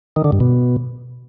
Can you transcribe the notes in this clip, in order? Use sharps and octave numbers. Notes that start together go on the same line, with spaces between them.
D#3
D3
G2
B2